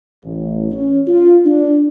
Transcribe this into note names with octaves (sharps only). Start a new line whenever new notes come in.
A1
C#4
F4
D4